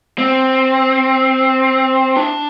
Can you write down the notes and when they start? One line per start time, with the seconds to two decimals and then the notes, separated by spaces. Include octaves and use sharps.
0.18 C4
2.17 D4